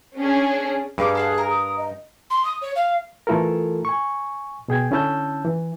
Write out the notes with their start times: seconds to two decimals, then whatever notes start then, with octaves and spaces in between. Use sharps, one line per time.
0.18 C#4 D4 G#4
0.98 G2 D#4 G#4 F5 D6
1.15 A4 F5 F#5
1.34 A#4 F#6
1.50 D#6
1.77 D#5
2.30 C6
2.45 D#6
2.62 C#5
2.76 F5
3.27 E3 A3 E4 F4 A4 A#4
3.85 G#5 C#6
4.68 B2 G#4 G5 G#6
4.91 D3 C#4 E4 A5 E6 G6
5.44 E3